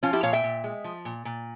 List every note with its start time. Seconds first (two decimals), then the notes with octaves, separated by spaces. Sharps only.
0.03 F3 C#4 F4
0.13 E4 G4
0.23 A#2 C#5 F5
0.33 E5 G5
0.44 A#2
0.64 G#3
0.84 F3
1.05 A#2
1.25 A#2